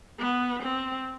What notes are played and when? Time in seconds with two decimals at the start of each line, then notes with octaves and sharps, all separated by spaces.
0.19 B3
0.63 C4